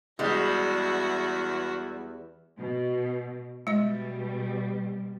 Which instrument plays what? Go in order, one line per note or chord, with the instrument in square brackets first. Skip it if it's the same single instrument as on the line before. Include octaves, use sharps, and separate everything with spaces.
[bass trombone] E2 [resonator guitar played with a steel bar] G3 G#3 [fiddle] F#4 E5
[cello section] B2
[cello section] B2 G3 [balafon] G#3 D#5